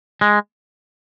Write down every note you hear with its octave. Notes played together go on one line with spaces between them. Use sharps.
G#3